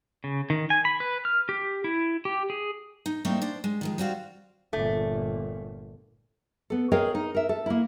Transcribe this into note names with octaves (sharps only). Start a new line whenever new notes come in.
C#3
D#3
G#5
B5
B4
F6
G4
E4
G4
G#4
D#4
G3 A3 A#3 C4 D#4 E4
D4 C5
G#3
D#3 F3 G#3
G3 C4 F#4 F5
G1 A#2 A3
B3 A4
G#4 A#4 C#5 D#5 F5 G5
D#4
A#4 E5
A4
A#3 E4